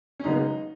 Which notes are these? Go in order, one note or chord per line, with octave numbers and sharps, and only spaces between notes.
C#4
F#1 F#2 C#3 G#3 B3 D#4